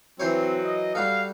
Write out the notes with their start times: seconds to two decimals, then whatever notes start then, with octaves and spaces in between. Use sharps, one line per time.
0.20 E3 F#3 C4 C5 C#5
0.64 D#5
0.95 G3 F#4 A4 F5